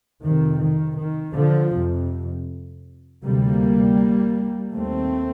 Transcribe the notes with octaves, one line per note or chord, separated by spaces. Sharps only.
F2 C3 D#3
D#3
D#3
D3 F3
F2 C3
D2 C3 G3 A#3
D#2 A3 C4